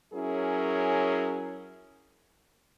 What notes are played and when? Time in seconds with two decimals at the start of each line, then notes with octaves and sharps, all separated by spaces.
0.13 F#3 C#4 E4 G#4 A#4